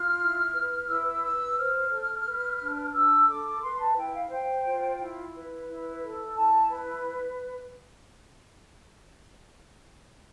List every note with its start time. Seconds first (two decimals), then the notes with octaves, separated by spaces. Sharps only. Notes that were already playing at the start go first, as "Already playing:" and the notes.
Already playing: F4 F6
0.20 E4
0.54 B4
0.89 E4 E6
1.23 B4 E6
1.57 C5 F6
1.92 A4
2.26 B4
2.61 D4
2.94 D4 E6
3.28 A4 D6
3.63 B4 C6
3.80 A5
3.97 E4 G5
4.14 F5
4.31 C5 G5
4.65 F4
5.00 E4
5.35 B4
5.69 E4
6.03 A4
6.37 E4 A5
6.71 B4 B5